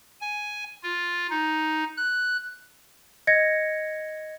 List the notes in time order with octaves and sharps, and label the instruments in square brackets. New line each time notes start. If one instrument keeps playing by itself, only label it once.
[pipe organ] G#5
F4
D#4
F#6
[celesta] D#5 G#6 A#6 C#7